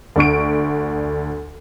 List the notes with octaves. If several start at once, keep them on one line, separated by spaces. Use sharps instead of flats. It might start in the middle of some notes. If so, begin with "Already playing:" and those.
D2 D3 C#6 D7